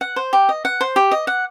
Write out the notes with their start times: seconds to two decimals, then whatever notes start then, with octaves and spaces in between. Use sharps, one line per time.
0.01 F#5
0.16 C5
0.33 G4
0.49 D#5
0.65 F#5
0.81 C5
0.96 G4
1.11 D#5
1.27 F#5